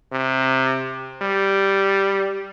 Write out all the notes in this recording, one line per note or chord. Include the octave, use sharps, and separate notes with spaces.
C3
G3